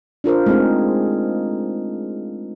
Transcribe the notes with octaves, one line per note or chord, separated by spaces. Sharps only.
D4 F4 A#4 C5
G#3 A3 C4 D#4 G#4